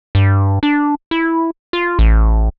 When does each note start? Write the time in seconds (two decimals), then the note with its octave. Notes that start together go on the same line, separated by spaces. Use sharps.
0.15 G2
0.63 D4
1.11 E4
1.73 F4
1.99 A1